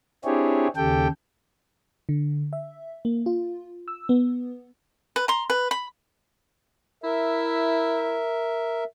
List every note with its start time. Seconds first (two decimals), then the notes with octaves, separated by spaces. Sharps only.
0.25 C4 D4 E4 G4 G#4 C#5
0.76 D#2 C#3 G4 A4 G5
2.09 D3
2.53 E5
3.05 A#3
3.26 F4
3.88 E6
4.09 B3
5.16 B4
5.28 A#5 C6
5.50 B4
5.71 B5
7.04 E4 A#4 E5